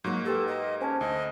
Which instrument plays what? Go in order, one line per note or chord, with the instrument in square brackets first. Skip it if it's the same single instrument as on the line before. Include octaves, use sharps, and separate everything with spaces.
[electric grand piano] G#2 A#3 [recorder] F#3
[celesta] G4 B4 G5 [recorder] A4
[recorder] D#5
[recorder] C#4 [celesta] C5 G#5 A5
[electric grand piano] D2 [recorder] D#5